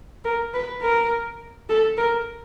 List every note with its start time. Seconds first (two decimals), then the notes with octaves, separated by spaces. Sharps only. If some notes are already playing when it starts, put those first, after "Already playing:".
0.25 A#4
0.54 B4
0.82 A#4
1.69 A4
1.98 A#4